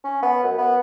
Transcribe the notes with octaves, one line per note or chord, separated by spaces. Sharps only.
C#4
B3
F#2
B3